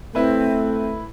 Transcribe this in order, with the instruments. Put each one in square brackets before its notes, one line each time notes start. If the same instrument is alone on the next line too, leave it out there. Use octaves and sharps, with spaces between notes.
[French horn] A3 [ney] C4 [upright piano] E4 B4